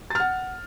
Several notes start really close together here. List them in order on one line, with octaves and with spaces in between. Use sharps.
A6 F6 F#5